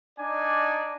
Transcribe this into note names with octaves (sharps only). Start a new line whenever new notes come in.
D4 D#4 D5 G#5